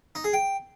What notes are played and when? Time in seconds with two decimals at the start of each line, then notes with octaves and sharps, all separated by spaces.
0.15 D#4
0.24 G#4
0.33 G5